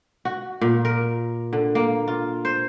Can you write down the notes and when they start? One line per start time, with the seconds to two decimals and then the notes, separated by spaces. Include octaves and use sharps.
0.25 F#4
0.61 A#2
0.85 A#4
1.53 D3
1.75 A#3
2.08 F4
2.45 C5